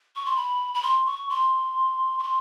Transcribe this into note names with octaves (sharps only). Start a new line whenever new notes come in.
C#6
C6
B5
B5
C6
C#6
C6
C#6
C6